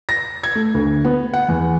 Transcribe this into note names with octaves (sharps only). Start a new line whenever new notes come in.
A#6
G#6
A3
D2
B3
F#5
E2